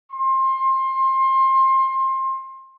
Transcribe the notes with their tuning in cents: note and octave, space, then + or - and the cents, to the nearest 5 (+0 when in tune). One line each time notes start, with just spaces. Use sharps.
C6 +25